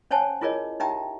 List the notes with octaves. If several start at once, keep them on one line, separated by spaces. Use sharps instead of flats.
C#4 C5 C#5 F#5 G#5 A5
E4 F4 G#4 A#4 C#5 D#5
D#4 G4 E5 G5 A#5